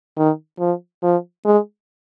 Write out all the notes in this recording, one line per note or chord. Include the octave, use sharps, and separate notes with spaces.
D#3
F3
F3
G#3